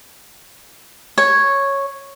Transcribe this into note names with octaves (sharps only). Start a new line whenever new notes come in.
C#5